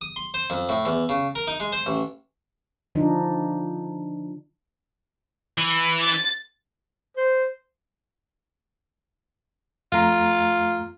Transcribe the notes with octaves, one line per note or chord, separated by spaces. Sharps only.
D#6
C6
C5
F2
A2
E2
C#3
A#4
D#4
G#3
C5
A1
D3 F3 D4 D#4
E3
A6
C5
F2 A3 F4 A#5